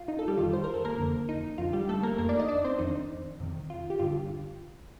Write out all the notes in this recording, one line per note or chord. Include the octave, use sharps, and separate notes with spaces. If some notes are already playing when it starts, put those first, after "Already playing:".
Already playing: F4
D#4
A4
G3 G4
F2 D#3 F4
C5
A#4
A4
A#3 A#4
F2 D3
D#4
F2 D3 F4
G3 G4
A3 A4
A#3 A#4
F2 D#3 A#3 A#4
D4 D5
D#4 D#5
D4 D5
C4 C5
F2 D#3 D#4
F2 C3 D#3
F4
G4
G2 D3 F4